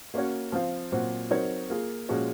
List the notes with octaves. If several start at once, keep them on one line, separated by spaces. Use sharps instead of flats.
A#3 C#4 F#4 C#5
F3 C4 F4
A#2 F#3 C4 F#4 C5
F#3 C4 D#4 A#4 C#5
A#3 F4 G#4
A#2 F3 G#3 C#4 F#4